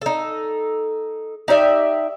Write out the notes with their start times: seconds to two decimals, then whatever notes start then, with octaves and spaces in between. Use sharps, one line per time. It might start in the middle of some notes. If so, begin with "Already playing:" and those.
0.02 D#4 A4
1.48 D#4 G4 D5 E5